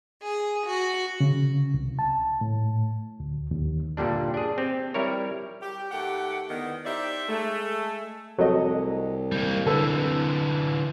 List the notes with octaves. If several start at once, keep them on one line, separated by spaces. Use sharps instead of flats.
G#4
F#4
C#3
C2
A5
A2
D2
D#2
G2 A#2 D3 G3 D4
D4 G#4
C4 G4
G3 E4 A#4 C#5
G4
D#2 A3 G4 F#5
E2 D3 D#3 B3
D#4 G4 C5 D5 E5
G#3 A3
C2 F#3 A3 D#5
G3 A#3
D3 E3 A4 B4